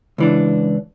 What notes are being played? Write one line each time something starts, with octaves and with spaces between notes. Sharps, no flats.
C#2 E3 D4